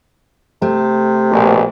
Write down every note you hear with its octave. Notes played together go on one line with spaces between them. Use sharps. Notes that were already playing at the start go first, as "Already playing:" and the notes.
C3 A3
A#1 B2